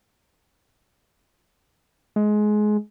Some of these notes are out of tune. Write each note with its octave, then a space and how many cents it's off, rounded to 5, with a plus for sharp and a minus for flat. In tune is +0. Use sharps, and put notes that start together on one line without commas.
G#3 +20